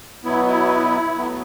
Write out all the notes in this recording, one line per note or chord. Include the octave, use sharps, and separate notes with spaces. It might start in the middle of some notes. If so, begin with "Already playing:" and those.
B2 F#3 B3 E4
E4
A2 F#3 B3